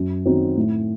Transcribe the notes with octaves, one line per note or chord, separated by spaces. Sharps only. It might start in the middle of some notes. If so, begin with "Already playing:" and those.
Already playing: F#2
D#3 F#3 C4 D#4
A2